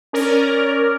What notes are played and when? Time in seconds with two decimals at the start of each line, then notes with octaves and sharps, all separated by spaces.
0.13 C#4 A#4 D5